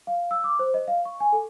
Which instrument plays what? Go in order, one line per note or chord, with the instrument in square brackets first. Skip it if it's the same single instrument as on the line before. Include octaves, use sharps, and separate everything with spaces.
[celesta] F5
E6
D6
C5
D#5
F5
C#6
G#5
A4